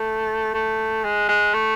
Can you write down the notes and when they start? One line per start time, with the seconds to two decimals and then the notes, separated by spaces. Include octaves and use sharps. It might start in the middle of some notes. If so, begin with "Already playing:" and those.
Already playing: A3
0.54 A3
1.04 G#3
1.29 G#3
1.54 A3